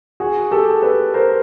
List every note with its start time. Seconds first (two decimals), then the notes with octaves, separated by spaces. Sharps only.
0.20 F#4 G#4
0.51 G4 A4
0.82 A4 B4
1.14 A#4 C5